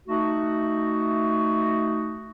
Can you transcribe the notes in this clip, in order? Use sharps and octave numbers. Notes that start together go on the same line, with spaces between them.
A3 D#4 F#4